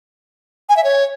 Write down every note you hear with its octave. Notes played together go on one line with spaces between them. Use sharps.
G#5
E5
C#5